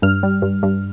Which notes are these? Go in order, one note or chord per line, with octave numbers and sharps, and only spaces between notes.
G2 F6
G3
G2
G2